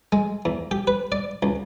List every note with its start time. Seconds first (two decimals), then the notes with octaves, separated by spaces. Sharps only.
0.12 G#3
0.45 E2
0.71 G4
0.87 B4
1.12 D5
1.43 C#2